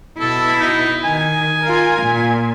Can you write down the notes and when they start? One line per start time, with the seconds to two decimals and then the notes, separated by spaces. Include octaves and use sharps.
0.20 B2 E4 A4
0.60 D#4
1.04 D#3 G#5
1.62 F4 A#4
2.02 A#2